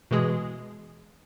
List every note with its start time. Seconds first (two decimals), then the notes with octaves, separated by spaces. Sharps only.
0.11 B2 E3 G#3 G#4